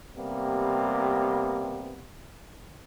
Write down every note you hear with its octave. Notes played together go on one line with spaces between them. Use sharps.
C3 G3 A#3 B3